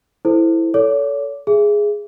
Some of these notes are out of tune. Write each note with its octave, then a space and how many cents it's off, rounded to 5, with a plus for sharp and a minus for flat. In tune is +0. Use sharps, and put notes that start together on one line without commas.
E4 +0 A4 +0 C5 -10
A4 +0 C#5 +35 D6 +0
G#4 +0 E5 +25